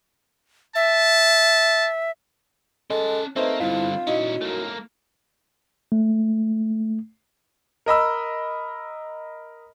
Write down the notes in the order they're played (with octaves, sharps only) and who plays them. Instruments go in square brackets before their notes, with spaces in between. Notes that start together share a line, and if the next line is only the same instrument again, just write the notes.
[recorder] E5 [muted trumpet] A5
[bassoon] G#3 [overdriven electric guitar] C#4 A5 [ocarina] A4
[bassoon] A3 [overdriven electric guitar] A#3 [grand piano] C4 D#4 C5 [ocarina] B4
[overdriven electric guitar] G2 D3 [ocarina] E4 [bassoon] F4
[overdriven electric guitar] A#2 C#4 [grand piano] D#4 E4 [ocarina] F#4
[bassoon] F#2 [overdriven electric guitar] A3 A#3
[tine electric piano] A3
[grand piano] A#4 D#5 B5 E6